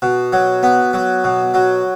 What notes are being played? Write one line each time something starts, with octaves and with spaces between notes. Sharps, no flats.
B2
F#3
B3
F#3
B2
F#3